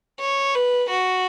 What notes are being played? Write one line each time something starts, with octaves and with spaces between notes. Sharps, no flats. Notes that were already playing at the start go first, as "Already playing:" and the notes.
C#5
B4
F#4